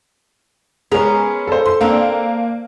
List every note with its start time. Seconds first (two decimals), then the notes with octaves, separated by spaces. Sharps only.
0.91 G#3 B3 C#4 A#4
1.47 A4 C5
1.66 C6
1.81 A#3 C4 D4 A#4